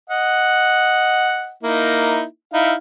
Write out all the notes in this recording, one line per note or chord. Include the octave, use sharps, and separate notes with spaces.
D#5 F#5
A#3 D#4 E4
D#4 E4 F5